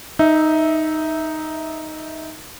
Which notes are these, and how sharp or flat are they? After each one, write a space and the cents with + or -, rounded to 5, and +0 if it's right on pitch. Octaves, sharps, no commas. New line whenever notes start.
D#4 +0 E5 -15